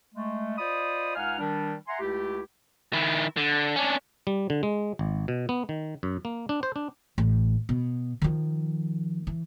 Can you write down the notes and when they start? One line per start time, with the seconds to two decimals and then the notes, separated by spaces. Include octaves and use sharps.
0.15 G#3 A3
0.58 F4 C5 D5 D#5 B5 D#6
1.16 C#2 D#4 F5 F#5 G#5 F6
1.39 D#3 G3 D4
1.88 E5 F#5 G#5 A#5 C6
2.00 C#2 A3 E4 G4
2.93 D#3 E4
3.37 D3
3.76 C#4 D4
4.27 G3
4.50 D3
4.63 G#3
4.99 G#1
5.28 B2
5.49 B3
5.69 D#3
6.03 F#2
6.25 A#3
6.49 D4
6.63 C5
6.76 D4
7.18 A1
7.69 B2
8.22 D#3 F3
9.27 E3